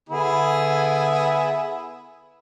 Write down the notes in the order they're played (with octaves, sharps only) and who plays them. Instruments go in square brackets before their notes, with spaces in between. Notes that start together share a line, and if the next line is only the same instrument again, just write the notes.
[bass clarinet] D3 [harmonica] B3 E4 G#4